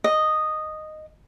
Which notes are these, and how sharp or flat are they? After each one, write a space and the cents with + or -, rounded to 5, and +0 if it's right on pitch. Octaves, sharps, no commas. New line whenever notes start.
D#5 -5